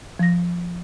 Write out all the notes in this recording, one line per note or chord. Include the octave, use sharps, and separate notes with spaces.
F3 A#6